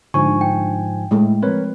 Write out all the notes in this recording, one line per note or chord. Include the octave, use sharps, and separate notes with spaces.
G#2 D3 F3 G#5 C#6
G5
A2 G#3 A3
F3 C4 A#4 B4 C#5